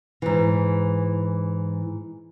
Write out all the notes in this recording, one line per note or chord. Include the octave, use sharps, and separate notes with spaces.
G#2 E3